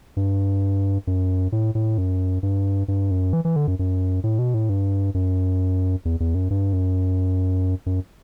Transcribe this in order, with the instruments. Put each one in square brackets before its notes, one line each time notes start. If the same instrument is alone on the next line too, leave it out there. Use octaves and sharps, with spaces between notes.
[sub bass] G2
F#2
A2
A2
F#2
G2
G2
F#2
E3
E3
D3
F#2
F#2
A2
B2
A2
G2
F#2
E2
E2
F#2
G2
F#2
F#2